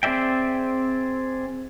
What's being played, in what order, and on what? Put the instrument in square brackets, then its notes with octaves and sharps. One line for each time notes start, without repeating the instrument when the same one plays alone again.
[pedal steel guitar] C4 G#4 D5 E5 G5